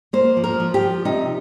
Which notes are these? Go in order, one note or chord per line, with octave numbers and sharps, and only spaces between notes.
A#3 C5
F3
A#4
F3
G4
F3
C3 D#4